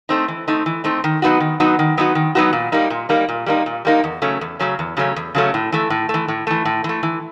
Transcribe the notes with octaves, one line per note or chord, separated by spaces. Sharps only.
A3 C4 D#4
E3
A3 C4 D#4
E3
A3 C4 D#4
D#3
F#3 B3 D#4 F#4
D#3
F#3 B3 D#4 F#4
D#3
F#3 B3 D#4 F#4
D#3
F#3 B3 D#4 F#4
A#2
G3 A#3 D#4
A#2
G3 A#3 D#4
A#2
G3 A#3 D#4
A#2
G3 A#3 D#4
E2
C#3 F#3 A3 C#4
E2
C#3 F#3 A3 C#4
E2
C#3 F#3 A3 C#4
E2
C#3 F#3 A3 C#4
A2
E3 A3
A2
A3
E3
A2
E3 A3
A2
E3 A3
E3